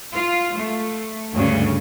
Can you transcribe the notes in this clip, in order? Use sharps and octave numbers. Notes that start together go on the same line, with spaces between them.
F4
A3
D2 G2 C#3